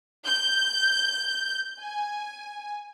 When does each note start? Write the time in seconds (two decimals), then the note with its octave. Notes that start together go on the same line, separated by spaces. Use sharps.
0.26 G6
1.80 G#5